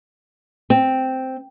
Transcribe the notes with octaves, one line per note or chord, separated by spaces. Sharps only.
C4